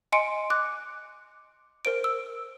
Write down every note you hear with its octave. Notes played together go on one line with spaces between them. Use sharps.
D#5 G#5 C6 C#7 D7
D6 F#6
A#4 C5 D7
E6